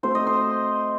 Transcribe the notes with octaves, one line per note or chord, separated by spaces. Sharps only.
A3 C4 F#4 C5
D#5
C5